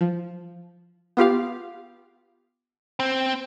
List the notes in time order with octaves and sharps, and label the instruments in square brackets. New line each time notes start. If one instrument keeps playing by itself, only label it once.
[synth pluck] F3
B3 F4 G4 F5
[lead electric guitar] C4